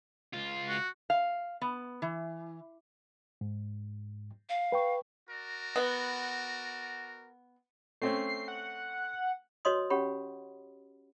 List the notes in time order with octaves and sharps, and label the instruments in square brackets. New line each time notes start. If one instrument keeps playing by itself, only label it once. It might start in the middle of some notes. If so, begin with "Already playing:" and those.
[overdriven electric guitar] C#2 F4
[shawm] F#4
[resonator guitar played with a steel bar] F5
B3
E3
[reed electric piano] G#2
[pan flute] F5
[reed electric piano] B4 G5 C#6
[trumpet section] F#4 A#4 D5
[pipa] B3
[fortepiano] A3 C4 C#4 [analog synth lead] C7
[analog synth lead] F#5
[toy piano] F#4 B4 C#5 D#5 C6 D#6
C#4 G4 C#5 F#5 B5